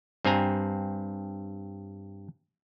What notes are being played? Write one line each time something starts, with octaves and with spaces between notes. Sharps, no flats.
G2 C4 G#5 A#5